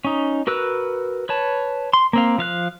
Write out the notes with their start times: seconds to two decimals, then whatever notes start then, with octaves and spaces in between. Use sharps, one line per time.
0.05 C#4 D#4
0.47 F#4 A#4 B4 E6 F#6
1.29 B4 C#5 A5
1.93 C6
2.13 A#3 C4 F5
2.38 F3 F5 F#6